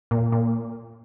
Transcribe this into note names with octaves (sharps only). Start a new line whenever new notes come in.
A#2
A#2